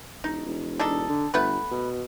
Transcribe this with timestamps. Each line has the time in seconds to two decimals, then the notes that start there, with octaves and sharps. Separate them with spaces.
0.24 E1 D#4
0.46 E1
0.79 D4 D#4 A4
1.09 D3
1.34 G1 A3 B3 B4
1.71 B2